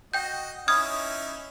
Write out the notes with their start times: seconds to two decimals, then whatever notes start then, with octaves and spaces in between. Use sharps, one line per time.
0.14 F#4 D#5 G5 G6
0.68 C#4 D#4 E4 D#6 F6 G#6